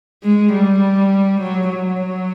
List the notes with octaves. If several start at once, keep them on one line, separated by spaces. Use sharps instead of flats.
G#3
G3
F#3
F#3